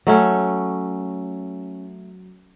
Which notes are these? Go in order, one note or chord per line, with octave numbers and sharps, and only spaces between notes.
F#3 A3 C#4